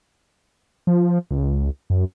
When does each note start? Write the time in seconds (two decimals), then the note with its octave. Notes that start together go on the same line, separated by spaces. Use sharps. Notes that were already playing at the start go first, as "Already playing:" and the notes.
0.87 F3
1.31 C#2
1.90 F#2